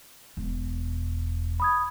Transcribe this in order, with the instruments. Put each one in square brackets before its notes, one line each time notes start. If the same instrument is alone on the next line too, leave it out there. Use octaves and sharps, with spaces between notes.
[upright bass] E1
[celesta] B5 D#6 G#6